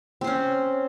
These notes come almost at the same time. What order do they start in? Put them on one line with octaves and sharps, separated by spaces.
C4 C5 C#4